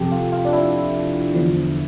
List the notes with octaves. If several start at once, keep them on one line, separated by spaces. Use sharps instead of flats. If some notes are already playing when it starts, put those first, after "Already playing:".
Already playing: F2 C3 F3 G4 A4
F4
F4
D4
E4
E2 D3 F3